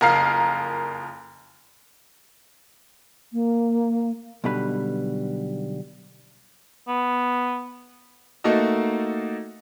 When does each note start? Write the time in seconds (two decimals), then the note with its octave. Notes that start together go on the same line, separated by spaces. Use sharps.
0.01 F#1 F2 A#4 F5 C7
3.33 A#3
4.44 B1 B2 D3 G3 B4
6.88 B3
8.44 A3 A#3 D#4 F#4 A4 D#5